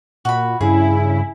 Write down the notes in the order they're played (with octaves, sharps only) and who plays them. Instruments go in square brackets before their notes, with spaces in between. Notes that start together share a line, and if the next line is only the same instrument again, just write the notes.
[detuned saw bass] A#2 [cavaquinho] F#4 B5
[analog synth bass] G2 [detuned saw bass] C#3 [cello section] E4 [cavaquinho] G#4